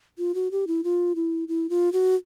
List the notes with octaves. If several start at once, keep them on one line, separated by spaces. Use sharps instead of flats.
F4
F#4
G4
E4
F4
E4
E4
F4
F#4